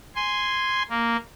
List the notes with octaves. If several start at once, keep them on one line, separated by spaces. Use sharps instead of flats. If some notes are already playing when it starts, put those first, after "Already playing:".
G#5 C6
A#3